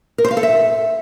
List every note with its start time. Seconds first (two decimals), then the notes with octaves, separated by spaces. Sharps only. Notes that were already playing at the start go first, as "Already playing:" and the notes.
0.18 A#4
0.25 C5
0.31 F5
0.37 A4
0.43 E5